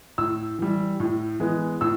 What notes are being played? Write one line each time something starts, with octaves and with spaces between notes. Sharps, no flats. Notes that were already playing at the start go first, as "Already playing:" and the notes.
A2 E6
E3 G3
A2
E3 G#3 B3
A2 E6